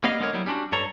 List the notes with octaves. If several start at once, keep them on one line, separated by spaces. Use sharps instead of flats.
G3 A#3 B3 D#5 F5
D3 G#3 B3 A#4 C#5
F#3 G3 B3 E4
G3 C#4 D4 F4 F#4
G2 A4 C#5 A#5